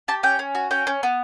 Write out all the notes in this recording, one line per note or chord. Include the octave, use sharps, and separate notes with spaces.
G4 A5
C#4 G5
C#4
F#4
C#4 G5
C#4
B3